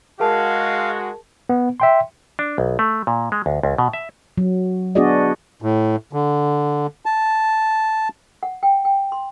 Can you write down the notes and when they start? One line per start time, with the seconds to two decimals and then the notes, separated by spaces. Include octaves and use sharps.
0.20 G#3 F#4 G#4 A#4 F5 A5
1.49 B3
1.80 E5 G5 C6
2.39 D4
2.58 B1
2.79 A3
3.07 A#2
3.32 G#3
3.46 D2
3.63 C#2
3.78 B2
3.93 E5
4.38 F#3
4.95 B3 D4 F#4 G#4 D5 D#5
5.62 A2
6.13 D3
7.06 A5
8.43 F#5
8.63 G5
8.85 G5
9.12 C6